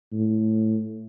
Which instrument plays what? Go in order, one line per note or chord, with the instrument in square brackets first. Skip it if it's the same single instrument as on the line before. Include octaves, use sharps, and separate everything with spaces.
[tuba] A2